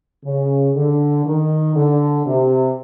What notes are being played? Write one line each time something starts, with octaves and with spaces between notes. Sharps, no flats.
C#3
D3
D#3
D3
C3